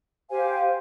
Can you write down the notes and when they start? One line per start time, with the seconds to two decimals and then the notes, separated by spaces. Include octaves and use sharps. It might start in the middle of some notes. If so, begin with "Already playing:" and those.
0.29 G4 C5 F5 G#5